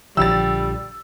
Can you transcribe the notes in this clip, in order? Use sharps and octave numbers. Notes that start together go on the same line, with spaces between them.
A#1 D3 F3 G3 E6 A6